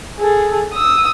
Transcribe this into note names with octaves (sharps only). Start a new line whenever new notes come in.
G#4 A4
D#6 E6